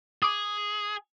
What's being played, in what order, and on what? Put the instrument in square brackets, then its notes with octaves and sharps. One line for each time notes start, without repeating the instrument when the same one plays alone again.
[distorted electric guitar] G#4 [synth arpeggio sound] D6 D#6